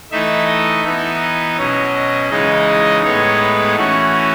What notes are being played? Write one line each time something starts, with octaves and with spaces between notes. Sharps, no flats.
E3 A3 D#4 E5
D#5
E3 B3 D#4 E5
D#5
B2 F#3 C#4
D#5
C#3 E3 G#3 D#4 D#5
A2 G#3 B3 D#4 C#5
B4
E3 A3 C#4 F#4